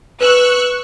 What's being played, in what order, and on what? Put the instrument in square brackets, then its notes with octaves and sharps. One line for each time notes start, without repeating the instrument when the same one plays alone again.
[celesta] B4 [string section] C#6 E6 F#6